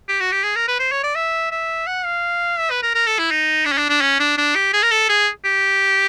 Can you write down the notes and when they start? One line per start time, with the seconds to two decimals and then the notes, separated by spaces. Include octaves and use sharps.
0.08 G4
0.20 F#4
0.32 G4
0.44 G#4
0.56 A#4
0.68 B4
0.80 C5
0.92 C#5
1.03 D5
1.15 E5
1.52 E5
1.87 F#5
2.05 F5
2.59 E5
2.71 B4
2.83 A#4
2.95 A#4
3.07 A4
3.19 E4
3.31 D#4
3.66 D4
3.73 C#4
3.78 D4
3.90 D4
4.02 C#4
4.20 D4
4.38 D4
4.55 G4
4.74 G#4
4.83 A#4
4.91 A4
5.09 G#4
5.45 G4